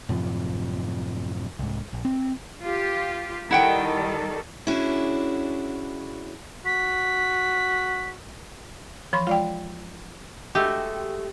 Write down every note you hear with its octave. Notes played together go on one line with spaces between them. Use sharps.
F#2 A2 C3 F3
C2 G#2
A#1
C4
F4 G4
D#3 G3 E4 A4 F#5 G5
C#4 D4 E4 F#4 G#4
F#4 B6
E3 F3 B5 C6
G#3 F4 D5 F5 G5
G#3 A3 F#4 G4